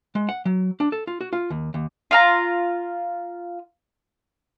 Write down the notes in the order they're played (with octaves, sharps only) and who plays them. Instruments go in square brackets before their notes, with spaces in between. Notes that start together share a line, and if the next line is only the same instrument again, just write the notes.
[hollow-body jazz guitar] G#3
F#5
F#3
D4
A4
F4
F#4
F4
D#2
D#2
[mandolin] F4 F5 A#5